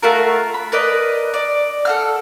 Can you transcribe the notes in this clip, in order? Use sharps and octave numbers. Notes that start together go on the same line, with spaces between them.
A3 F4 F#4 A#4
B5
A#4 B4 D5 D#5
D5
A4 F#5 F6